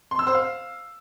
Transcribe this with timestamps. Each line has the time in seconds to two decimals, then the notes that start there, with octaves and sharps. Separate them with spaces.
0.11 C6
0.19 E6
0.27 C5
0.35 F5